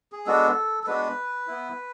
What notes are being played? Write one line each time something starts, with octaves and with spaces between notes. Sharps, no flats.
G#4
G#3 B3 D4 F#4 A4
A4
G#3 B3 D4 F#4 B4
B3 E4